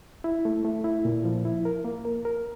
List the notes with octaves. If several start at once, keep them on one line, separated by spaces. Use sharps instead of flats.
E4
A3
A3
E4
A#2
F3
E4
A#4
A#3
A#4
A#4